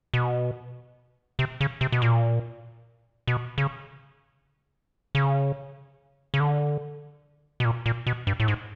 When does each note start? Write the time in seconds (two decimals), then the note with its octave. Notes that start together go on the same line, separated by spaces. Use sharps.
0.14 B2
1.39 C3
1.61 C#3
1.81 C3
1.92 B2
2.02 A#2
3.27 B2
3.58 C#3
5.15 C#3
6.34 C#3
6.40 D3
7.60 B2
7.65 A#2
7.86 A#2
8.07 B2
8.27 G2
8.40 A2
8.48 G#2